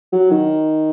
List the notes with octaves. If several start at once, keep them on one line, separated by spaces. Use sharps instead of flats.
F#3
D#3